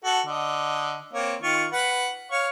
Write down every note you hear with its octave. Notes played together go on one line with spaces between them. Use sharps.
F#4 A4
D3 D#5
A#3 C4 C#5
D#3 F4 C#6
B4 F#5
C#5 F5 C#6